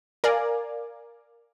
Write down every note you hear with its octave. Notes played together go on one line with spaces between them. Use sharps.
A#4 D5 F5 G#5